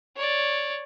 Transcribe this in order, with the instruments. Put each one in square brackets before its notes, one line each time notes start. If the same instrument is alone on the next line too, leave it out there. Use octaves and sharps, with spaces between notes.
[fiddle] C#5 D5